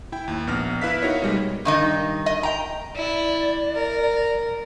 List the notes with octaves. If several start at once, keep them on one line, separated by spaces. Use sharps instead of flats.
E4 G5
D#2
A#1 B3 F6 A#6
E4 B4 E5 F5 B6
D#4 F#4 A#4 C#5 D#5
B2 G3 G#3
G2 D#3 D#4
D#5
G5 A#5
E4 D5
A#4